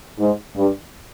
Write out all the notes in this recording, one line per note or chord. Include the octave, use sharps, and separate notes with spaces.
G#2
G2